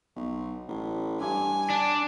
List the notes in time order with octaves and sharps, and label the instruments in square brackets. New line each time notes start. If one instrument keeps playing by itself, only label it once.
[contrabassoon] B1
A1
[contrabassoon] G2 [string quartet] G#5
[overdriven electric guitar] D4